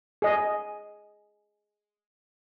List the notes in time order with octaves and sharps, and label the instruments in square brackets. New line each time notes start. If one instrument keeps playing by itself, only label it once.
[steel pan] G#4 D#5